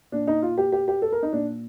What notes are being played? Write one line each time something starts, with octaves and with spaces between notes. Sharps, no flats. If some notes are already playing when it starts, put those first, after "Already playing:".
A#2 D4
D#4
F4
G4
G4
G4
A4
A#4
D#4
A#2 D4